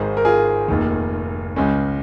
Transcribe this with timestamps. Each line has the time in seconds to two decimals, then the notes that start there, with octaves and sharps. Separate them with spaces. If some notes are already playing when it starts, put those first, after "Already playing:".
Already playing: G#1 G#2 D#3 G#4 C5
0.17 A#4
0.25 F4 G#4
0.68 F1 D#2 D#3
1.56 C#2 C#3 G#3 C#4